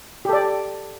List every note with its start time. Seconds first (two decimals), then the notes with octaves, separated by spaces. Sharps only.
0.25 G4
0.29 A4
0.33 D5